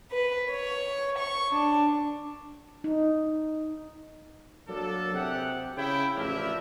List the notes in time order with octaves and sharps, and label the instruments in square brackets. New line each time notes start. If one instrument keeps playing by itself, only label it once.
[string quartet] B4
C#5
C#6
D4
[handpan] D#4
[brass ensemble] F#3 A#3 D4 A4
C3 G4 G#4 F#5
C#3 E4 G5
A1 F3 D4 E4 A#4 E5